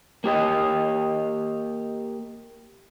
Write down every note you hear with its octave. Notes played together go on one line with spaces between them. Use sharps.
A#3 G4 D#5